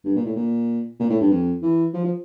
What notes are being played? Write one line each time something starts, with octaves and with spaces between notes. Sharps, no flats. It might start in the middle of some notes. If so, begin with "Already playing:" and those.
G2
A#2
A2
A#2
A#2
A2
G2
F2
E3
F3
F3